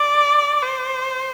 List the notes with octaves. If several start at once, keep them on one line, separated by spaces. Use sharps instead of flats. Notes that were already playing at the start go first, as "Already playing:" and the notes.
Already playing: D5
C5